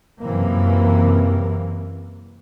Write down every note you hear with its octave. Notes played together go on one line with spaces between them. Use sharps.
F#2 C3 E3 A#3